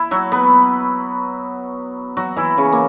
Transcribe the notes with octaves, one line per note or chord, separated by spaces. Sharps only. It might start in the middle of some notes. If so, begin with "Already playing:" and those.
Already playing: E4
F#3 F#4
B3 B4
F#3 F#4
E3 E4
C#3 C#4
A#3